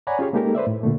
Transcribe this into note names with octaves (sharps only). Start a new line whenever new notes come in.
C#5 D5 F#5 G#5 A#5 B5
C#4 F4 G4 G#4 C#5
G#3 A#3 D#4 G4 A4 A#4
B4 C5 D5 E5
A2
A#2 D3 A3